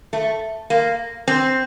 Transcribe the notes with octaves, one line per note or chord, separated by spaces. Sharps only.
A3
A#3
C4